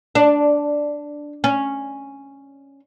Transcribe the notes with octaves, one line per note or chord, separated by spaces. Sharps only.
D4
C#4